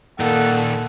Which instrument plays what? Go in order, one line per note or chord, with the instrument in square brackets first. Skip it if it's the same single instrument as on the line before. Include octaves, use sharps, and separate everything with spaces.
[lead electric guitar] A#2 D#3 [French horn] A#3 [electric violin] A4 [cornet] F#5